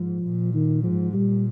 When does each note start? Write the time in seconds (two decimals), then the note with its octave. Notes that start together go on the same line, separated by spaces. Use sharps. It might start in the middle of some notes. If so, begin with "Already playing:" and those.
Already playing: G#2 F3
0.23 A#2
0.54 D#3
0.83 G#2 F3
1.13 A#2 G3